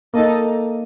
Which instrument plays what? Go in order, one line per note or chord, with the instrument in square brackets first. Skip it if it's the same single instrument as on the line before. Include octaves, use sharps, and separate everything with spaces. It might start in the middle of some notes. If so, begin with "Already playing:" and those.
[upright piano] A#3 [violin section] D#4 A4 D#5